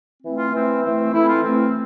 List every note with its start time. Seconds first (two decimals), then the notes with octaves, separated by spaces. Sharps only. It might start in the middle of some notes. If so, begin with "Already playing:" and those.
0.23 E3 A3 C4
0.38 F4
0.53 E3 A3 C4
0.83 E3 A3 C4
1.12 E3 A3 C4 E4
1.27 F4
1.42 E3 A3 C4